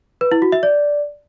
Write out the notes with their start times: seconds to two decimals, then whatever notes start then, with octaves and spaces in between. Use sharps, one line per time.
0.21 B4
0.32 E4
0.42 F#4
0.52 E5
0.63 D5